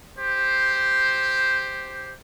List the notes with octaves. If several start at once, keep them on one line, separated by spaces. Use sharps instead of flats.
G4 C5